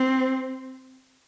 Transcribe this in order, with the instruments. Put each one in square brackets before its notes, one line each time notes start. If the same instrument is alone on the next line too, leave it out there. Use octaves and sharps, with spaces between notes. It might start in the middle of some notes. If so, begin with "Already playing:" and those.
Already playing: [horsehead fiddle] C4